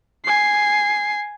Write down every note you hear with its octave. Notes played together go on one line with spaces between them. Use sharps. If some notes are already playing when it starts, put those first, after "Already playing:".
G#5 C7